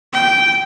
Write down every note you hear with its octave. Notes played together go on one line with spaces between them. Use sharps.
G5